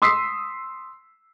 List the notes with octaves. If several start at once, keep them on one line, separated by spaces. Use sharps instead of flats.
C6 D#6 E6 B6 C7